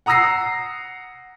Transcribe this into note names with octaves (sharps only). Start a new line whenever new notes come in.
F#5 A#5 D#6 E6 A#6 C7